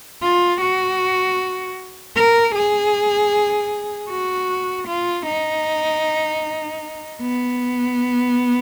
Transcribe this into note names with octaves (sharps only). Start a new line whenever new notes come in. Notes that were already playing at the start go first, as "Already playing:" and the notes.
F4
F#4
A#4
G#4
F#4
F4
D#4
B3